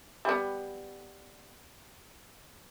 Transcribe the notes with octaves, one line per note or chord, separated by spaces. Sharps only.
G3 B3